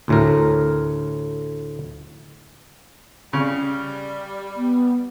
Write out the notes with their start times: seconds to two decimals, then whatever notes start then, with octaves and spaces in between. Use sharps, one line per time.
0.08 D2 A2 A#4
3.33 C#3 G3
4.56 B3